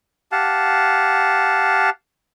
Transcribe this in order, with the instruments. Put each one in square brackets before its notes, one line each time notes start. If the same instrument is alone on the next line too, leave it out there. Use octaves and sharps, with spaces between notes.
[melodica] G4 F5 F#5 A5